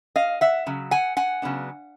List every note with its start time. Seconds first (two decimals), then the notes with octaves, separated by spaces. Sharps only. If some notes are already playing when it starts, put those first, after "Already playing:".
0.16 D#5 F5
0.41 E5 F#5
0.66 C#3 F#3
0.91 F#5 G#5
1.17 F#5 G#5
1.42 C#3 F#3 B3 D4